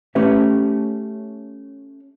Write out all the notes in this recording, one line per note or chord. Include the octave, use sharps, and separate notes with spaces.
A3 C#4 G4 B4 E5